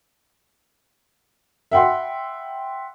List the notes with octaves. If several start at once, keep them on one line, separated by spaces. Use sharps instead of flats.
E5 F#5 G5 B5 C6